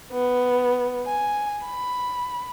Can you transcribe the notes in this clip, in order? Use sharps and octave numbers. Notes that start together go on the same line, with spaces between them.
B3
G#5
B5